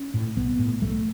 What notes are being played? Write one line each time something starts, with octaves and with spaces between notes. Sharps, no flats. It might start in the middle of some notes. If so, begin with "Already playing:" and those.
Already playing: C#4
A2
B1 B3
A2
B1 A3